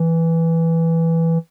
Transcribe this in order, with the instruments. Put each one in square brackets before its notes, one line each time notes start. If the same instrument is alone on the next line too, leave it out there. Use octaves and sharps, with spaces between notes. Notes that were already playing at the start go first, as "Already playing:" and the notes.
Already playing: [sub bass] E3